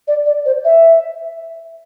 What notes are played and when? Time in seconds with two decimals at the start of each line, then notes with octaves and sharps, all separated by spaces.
0.08 D5
0.26 D5
0.46 C5
0.65 E5